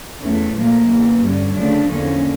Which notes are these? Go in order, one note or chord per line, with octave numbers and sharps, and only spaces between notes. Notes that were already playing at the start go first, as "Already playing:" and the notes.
E2 E3 A3 C#4
A#2 F3 A3 A#3
E2 C#3 E3
G2 D3 G3 C#4
D2 C#3 F3 A3 D4
E2 D3 F3 A#3 C#4